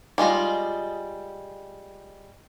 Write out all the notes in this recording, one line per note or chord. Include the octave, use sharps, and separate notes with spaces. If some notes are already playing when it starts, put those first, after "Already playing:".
G3 G#3 F4 D#5